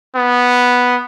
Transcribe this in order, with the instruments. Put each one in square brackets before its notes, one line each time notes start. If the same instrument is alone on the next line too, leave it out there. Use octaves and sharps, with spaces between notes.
[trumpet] B3